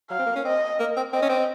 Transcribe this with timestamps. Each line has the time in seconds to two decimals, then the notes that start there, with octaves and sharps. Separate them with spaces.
0.10 F#3 F5
0.19 C4
0.27 A#3
0.36 C#4
0.44 C4 D#5
0.80 A#3
0.97 C4
1.13 C4 D#5
1.22 C#4
1.30 C4